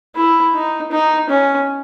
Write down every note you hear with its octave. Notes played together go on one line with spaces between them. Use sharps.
E4
D#4
D#4
C#4